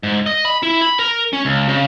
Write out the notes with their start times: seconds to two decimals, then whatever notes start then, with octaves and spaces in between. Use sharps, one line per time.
0.03 G#2
0.26 D#5
0.45 B5
0.63 E4
0.81 B5
0.99 A#4
1.33 C#4
1.45 C#2
1.69 C#3